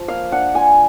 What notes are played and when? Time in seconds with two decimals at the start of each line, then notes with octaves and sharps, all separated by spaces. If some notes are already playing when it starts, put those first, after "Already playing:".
Already playing: F3
0.08 A#3 F5
0.31 D4 F#5
0.55 F4 G#5